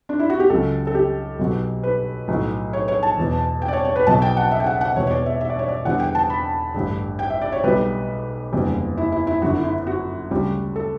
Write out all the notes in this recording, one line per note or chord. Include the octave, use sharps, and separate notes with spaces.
D4
E4
F#4
G4
C#2 C#3 F#3 A4
A4
G4
B1 B2 F#3
B4
B1 A2 F#3
C#5
C#5
A5
E1 E2 B2
G5
D5
C#5
C#5
B4
B1 B2 F#3 A5
G5
F#5
E5
G5
F#5
F#5
E1 E2 B2 C#5
C#5
D5
E5
E5
D5
C#5
D5
E2 D3 G3 F#5
G5
A5
B5
A1 G2 D3
G5
E5
D5
C#5
B1 B2 G3 B4
F#1 E2 D3 G3
E4
E4
E4
G1 F#2 D3 F#4
E4
E4
F#4
D2 C#3 G3
A4